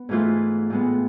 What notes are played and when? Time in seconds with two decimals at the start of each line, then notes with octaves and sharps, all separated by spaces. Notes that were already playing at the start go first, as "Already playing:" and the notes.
Already playing: B3
0.09 G#2 E3 A3 F4
0.70 A2 G#3 B3